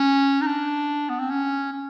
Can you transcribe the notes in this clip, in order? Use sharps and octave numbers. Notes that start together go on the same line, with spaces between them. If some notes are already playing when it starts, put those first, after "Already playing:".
Already playing: C#4
D#4
D4
B3
C4
C#4
C#4